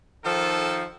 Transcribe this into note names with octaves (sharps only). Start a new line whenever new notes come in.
D#3 F3 A4